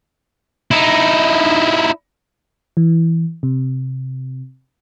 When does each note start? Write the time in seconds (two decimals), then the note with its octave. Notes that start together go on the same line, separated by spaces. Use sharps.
0.71 D#4 E4
2.77 E3
3.43 C3